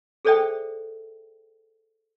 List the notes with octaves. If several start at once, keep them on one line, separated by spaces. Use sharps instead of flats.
G#4 A4 C5 D5 E5 G5